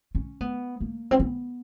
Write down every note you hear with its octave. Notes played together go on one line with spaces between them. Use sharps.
C#4
B3
A#3
C4
B3